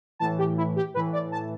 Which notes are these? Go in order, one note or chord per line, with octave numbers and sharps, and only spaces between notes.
A2 E3 A5
G4
E4
G4
A2 E3 B4
D5
A5